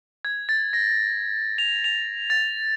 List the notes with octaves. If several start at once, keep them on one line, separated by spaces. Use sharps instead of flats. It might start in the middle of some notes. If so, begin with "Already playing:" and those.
G#6
A6
A#6
F7
F7
A6